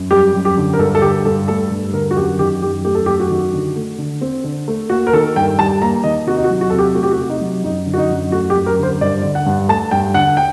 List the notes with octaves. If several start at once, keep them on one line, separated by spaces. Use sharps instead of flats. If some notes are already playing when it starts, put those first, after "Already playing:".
Already playing: F#2
G3 G4
F#2
G4
D3
A#4
G2 A4
A4
D3 G4
G2 A4
A3 A4
G2
D3 A#4
F#4
F#2 G4
D#3 G4
F#2 G4
A3 G4
A4
F#2 G4
F#4
D#3
D3
A3
D3
C4
D3
A3
A#3 F#4
A#4
D#3 A4
G2 G5
G3 A5
A#3 A#5
D#3 D#5
C3 F#4
D#4
F#4
F#3
F#4
A4
C3
G4
A3 F#4
G4
F#4
C3
D#4
F#3
F#2 D#4
D3
F#4
D#4
F#2
A3 F#4
G4
F#2
A#4
D3 C5
G2 D5
D3
F#5
G2
A3 A5
G2 G5
D3 F#5
G5